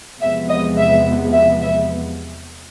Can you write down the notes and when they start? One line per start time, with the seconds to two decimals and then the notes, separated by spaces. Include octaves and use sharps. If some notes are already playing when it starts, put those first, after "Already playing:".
0.21 E2 C3 F3 G#3 B3 E5
0.49 D#5
0.77 E5
1.33 E5
1.61 E5